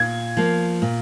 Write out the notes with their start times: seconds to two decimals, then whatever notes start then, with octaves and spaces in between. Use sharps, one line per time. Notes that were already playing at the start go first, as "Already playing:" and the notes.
Already playing: A#2 G#6
0.37 F3 A#3
0.82 A#2